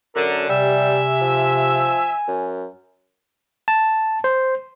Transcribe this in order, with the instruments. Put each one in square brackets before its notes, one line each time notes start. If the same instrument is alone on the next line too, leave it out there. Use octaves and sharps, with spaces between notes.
[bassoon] F#2 [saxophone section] D3 [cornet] A#4
[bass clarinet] C3 [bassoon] G3 [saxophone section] E5 [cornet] G#5
[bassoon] F3
F#2
[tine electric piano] A5
C5